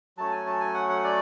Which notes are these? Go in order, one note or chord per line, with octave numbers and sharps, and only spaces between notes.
F#3 A3 C#4 A5
G#5
A5
G#5
F#5
F#5
D5